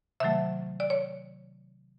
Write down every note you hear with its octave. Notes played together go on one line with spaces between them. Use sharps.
C3 D#3 F#3 A3 E5
D5
C#5